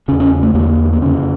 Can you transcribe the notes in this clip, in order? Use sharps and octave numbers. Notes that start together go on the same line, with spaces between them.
E2 C#3 C#4
C#4
A3
E2 D3 A#3
A#3
F2 C#3 C#4